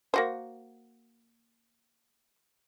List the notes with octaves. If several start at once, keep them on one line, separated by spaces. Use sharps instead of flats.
A#3 F#4 C5